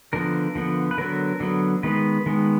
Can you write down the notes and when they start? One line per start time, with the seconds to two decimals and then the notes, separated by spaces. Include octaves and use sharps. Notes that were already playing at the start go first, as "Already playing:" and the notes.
0.13 D3 F3 B3 A#4
0.55 D3 F3 B3
0.91 B4
0.98 D3 F#3 B3 A#4
1.40 D3 F#3 B3
1.83 D#3 G#3 B3 B4
2.26 D#3 G#3 B3